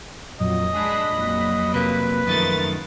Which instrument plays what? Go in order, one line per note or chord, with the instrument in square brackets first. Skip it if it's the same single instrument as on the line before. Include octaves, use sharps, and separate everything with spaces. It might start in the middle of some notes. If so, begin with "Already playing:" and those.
[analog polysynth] F2 A#2 F#3 [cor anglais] D#5
[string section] G#3 D4 G#4 [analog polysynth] B5 F#6 B6
[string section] F2 A#2 F#3
[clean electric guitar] C3 A#3 [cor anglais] B4
[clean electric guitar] F#2 D#3 A3 [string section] F3 A#4 A6